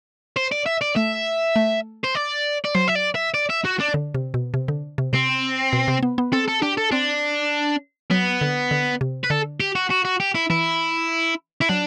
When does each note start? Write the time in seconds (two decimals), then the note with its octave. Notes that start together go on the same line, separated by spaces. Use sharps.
0.37 C5
0.52 D5
0.66 E5
0.82 D5
0.96 A3 E5
1.56 A3
2.04 C5
2.15 D5
2.65 D5
2.74 F#3 C5
2.88 E5
2.95 D5
3.15 E5
3.34 D5
3.50 E5
3.65 F#4
3.80 D4
3.94 D3
4.15 C3
4.34 B2
4.54 C3
4.68 D3
4.98 C3
5.13 C3 C4
5.73 B2
5.88 C3
6.03 B3
6.18 B3
6.33 C4 A4
6.48 A4
6.62 D4 G4
6.77 A4
6.92 C4 D4
8.11 F#3 B3
8.41 D3
8.71 D3
9.01 C3
9.24 B4
9.30 D3 A4
9.60 G4
9.75 F#4
9.90 F#4
10.05 F#4
10.20 G4
10.35 E4
10.50 E3 E4
11.61 E4
11.69 F#3 D4